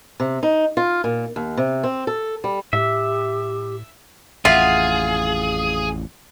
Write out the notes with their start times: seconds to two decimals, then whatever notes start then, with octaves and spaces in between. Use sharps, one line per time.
0.20 C3
0.43 D#4
0.77 F4
1.04 A#2
1.36 D#2
1.57 C3
1.84 C4
2.07 A4
2.44 G3
2.73 A2 G4 E5
4.45 A1 F2 F4 G#4 E5 F#5